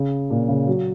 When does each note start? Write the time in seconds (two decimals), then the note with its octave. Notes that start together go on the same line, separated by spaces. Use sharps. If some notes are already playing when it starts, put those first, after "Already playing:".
Already playing: C#3
0.30 A#2
0.49 C#3
0.67 F#3